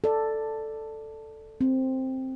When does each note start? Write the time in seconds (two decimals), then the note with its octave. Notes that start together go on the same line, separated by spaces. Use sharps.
0.04 A4 D5
1.61 C4